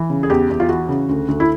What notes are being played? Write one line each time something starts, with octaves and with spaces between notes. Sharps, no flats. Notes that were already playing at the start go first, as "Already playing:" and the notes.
Already playing: E3
C#3
G#4
E2 G4
E2
F4
E3 F#4
C#3
D2
D2
E4